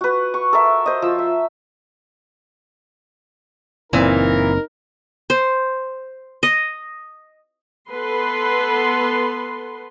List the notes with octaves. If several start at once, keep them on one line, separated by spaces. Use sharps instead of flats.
F#4 B4
C#6
A4 A#4 E5
C5 D#5
F3 E6
E5
F#1 A#2 E3 C4 D#4 A#4
C5
D#5
B3 A4 B4 C6